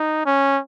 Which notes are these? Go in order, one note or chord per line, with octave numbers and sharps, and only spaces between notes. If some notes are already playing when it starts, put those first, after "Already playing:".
Already playing: D#4
C#4